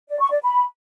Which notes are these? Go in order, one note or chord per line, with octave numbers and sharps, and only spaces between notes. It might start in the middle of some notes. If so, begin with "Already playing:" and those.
D5
C#6
D5
B5